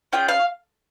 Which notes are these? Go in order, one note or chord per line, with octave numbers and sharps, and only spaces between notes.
C#4 F4 G#4 G5
F5